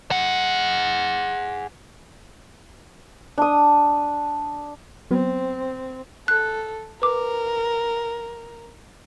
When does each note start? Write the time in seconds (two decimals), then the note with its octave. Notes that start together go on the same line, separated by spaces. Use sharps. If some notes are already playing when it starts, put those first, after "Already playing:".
0.11 G#4 F#5
3.38 D4 D#6
5.11 F#3 B3 C4
6.28 A4 F#6
7.02 A#4 B4 D6